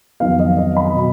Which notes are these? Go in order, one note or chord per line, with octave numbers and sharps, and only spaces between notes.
F2 D#3 F#3 B3 F5
D#5
F5
D#5
B5
B2 F#3